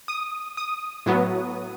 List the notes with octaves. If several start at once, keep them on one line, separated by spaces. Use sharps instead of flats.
D#6
D#6
A2 F#3 B3